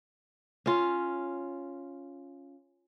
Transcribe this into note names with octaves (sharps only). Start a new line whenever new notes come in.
C#4 F4